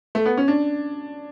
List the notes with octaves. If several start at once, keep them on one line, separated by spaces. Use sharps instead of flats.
A3
B3
C#4
D4